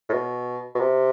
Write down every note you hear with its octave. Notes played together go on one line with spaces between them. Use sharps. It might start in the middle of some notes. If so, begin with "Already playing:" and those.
A2
B2
B2
C3